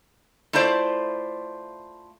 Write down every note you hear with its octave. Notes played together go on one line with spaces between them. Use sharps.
A3 E4 F4 C5 D5